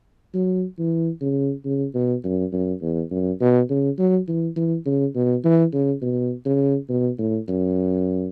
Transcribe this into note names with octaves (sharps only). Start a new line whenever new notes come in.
F#3
E3
C#3
C#3
B2
F#2
F#2
E2
F#2
B2
C#3
F#3
E3
E3
C#3
B2
E3
C#3
B2
C#3
B2
A2
F#2